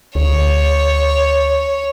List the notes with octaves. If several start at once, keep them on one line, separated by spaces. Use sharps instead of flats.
D2 C#5